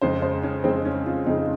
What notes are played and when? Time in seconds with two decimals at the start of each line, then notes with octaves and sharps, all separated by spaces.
0.02 F2 C#3 G#3 C5
0.22 C5
0.43 C#4
0.64 F2 C#3 G#3 C4
0.85 C#4
1.06 F4
1.26 F2 C#3 G#3 D#4